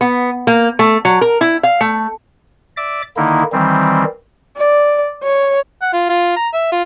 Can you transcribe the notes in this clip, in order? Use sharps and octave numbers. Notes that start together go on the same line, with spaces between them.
B3
A#3
A3
F#3
A#4
E4
F5
A3
D5 E5 D6
D3 D#3 A#3 D#4 E4
D#3 E3 G3 C4
D5
C#5
F#5
F4
F4
A#5
E5
F4